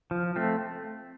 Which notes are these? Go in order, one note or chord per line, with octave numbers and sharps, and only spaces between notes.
F3
A3 C4